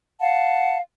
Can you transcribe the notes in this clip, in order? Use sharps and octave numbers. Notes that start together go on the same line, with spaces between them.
F5 F#5 A5